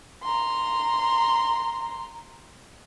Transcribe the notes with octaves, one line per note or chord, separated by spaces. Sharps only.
A#5 C6